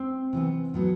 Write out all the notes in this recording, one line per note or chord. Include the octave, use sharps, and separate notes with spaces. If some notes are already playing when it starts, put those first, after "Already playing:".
Already playing: C4
C3 E3 B3
A2 F#3 B3